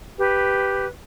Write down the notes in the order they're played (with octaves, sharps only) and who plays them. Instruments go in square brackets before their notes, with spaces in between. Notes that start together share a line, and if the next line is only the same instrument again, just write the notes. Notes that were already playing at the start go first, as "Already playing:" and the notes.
[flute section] G4 B4